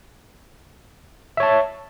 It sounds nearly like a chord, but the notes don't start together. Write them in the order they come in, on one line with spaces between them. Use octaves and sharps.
E5 C#5 A5